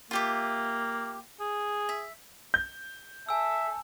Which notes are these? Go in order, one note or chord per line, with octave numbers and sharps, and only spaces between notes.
A#3 F4 G4 E5
G#4
E5
G6
A4 E5 G#5 E6